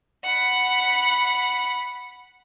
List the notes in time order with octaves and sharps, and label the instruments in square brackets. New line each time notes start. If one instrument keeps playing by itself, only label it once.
[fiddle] F#5 B5